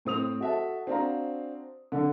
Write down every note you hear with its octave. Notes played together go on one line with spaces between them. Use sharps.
A2 C4 D#6 F7
F#4 A4 E5 F#5 A5
C4 D4 F#4 C5 F5 A#5
D3